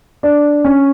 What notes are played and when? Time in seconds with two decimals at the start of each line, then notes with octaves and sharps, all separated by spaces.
0.23 D4
0.65 C#4